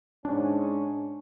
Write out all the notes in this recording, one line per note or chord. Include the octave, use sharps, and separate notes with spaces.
G#2 C#4 D4